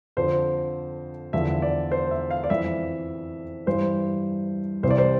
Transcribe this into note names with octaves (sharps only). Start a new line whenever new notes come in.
F2 D3 F3 C5
E2 D3 F3 E5
D5
C5
E5
F5
D5
F2 E3 E5
G2 E3 C5
C2 C3 E3 C5
D5
C5